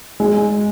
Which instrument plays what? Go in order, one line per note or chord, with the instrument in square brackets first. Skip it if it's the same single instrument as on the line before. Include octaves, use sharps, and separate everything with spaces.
[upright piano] G#3